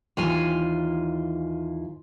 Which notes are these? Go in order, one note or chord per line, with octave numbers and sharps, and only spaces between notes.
D#2 E3 F4 G#5